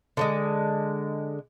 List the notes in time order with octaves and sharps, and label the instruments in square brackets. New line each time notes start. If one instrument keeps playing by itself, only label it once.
[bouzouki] D3 F3 G#3